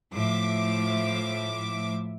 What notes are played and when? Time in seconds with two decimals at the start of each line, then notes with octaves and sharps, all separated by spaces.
0.12 A2 F3 E5 D6